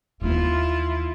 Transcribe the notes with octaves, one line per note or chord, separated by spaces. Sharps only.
D#2 E3 B3 E4 F4